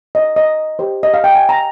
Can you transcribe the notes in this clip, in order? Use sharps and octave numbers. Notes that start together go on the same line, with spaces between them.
D#5
D#5
G4 C5
D#5
F5
G5
G#5
A#5